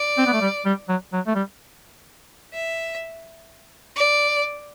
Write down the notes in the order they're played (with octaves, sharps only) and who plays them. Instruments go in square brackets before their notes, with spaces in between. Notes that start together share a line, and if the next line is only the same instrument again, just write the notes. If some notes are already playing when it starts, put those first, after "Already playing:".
Already playing: [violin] D5
[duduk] C4
B3
A3
G3
G3
F#3
F#3
A3
G3
[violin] E5
D5